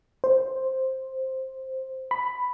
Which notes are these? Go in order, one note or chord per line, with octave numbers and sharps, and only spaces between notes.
C5
B5